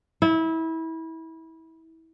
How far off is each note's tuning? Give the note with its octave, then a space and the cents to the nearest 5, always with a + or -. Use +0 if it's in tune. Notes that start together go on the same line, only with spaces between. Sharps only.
E4 -25